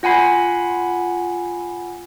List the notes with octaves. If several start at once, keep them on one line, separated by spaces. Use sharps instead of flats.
F4 F#5 G#5 B5 C7